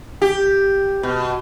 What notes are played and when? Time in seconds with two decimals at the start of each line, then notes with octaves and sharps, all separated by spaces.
0.22 G4
1.03 B2